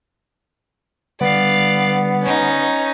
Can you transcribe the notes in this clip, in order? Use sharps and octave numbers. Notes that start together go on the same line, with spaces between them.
D3 G3 B3 D5 F5
C#4 D#4